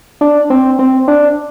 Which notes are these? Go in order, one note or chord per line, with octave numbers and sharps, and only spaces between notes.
D4
C4
C4
D4